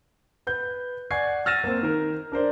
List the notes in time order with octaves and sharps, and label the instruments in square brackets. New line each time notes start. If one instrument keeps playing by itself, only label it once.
[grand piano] B4 G6
D5 F#5 G#5 C#6 G#6 C7
E6 F6 A6 A#6 D#7 E7
A#3 C4
D#3 A#4
D4 A#4 C5 D5